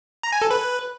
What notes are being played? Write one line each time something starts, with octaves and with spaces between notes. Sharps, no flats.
A#5
G#5
A4
B4